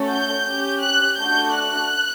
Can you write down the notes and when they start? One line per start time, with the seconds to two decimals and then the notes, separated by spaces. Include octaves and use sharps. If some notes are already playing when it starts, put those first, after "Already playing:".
Already playing: A3 C#4 F#4 A4
0.09 G6
0.45 C#4 G4
0.81 F#6
1.18 A3 D4 F#4 A4 G6
1.55 F#6